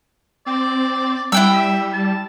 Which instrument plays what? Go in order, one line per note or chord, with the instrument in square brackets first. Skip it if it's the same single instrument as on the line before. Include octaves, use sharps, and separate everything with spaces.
[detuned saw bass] C4 [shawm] D5
[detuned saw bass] G3 [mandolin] E4 G5 E6 [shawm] F#5
[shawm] E5
A5